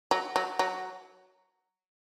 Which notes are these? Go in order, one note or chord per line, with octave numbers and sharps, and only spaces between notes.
F#3
F#3
F#3